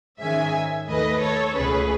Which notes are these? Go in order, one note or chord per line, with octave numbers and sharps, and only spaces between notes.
G#2 D#3 G#3 C#4 E5 G#5
D#2 D#3 A3 B4 D#5
A4 C#5
C#2 B2 A3 C#4 G#4 B4